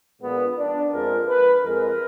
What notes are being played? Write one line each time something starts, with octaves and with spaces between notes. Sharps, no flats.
A#1 A#2 G#3 B3
D4
F2 F3 G#3 A#4
B4
F2 F3 G#3 A#4